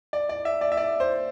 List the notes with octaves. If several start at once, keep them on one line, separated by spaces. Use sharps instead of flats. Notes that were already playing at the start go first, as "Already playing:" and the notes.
D5
D5
E5
D5
E5
D5
C5